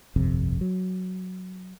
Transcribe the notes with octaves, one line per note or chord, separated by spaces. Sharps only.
G1 C2 F2 C3
F#3